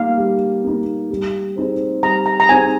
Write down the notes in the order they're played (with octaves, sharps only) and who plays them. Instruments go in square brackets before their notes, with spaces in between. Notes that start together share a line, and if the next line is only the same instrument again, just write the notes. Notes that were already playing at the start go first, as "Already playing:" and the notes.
Already playing: [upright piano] G3 A#3 D#4 [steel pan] F5
[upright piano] G3
A#3 D#4
G3
C4 D#4 G#4 C5
[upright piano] G3 [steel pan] A#5
[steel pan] A#5
A#5
[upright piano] C4 D#4 G#4 C5 [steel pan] G#5